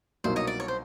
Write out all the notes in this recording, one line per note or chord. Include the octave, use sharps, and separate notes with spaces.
C2 B2 F#3 A#3 D#4 C5
C#5 D#5
D5
C#5
C5